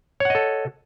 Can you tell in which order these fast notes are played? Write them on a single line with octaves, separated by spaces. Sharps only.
C#5 F#5 D#5 A4